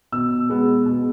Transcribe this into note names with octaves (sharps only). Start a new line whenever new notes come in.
B2 E6
G#3 B3
B2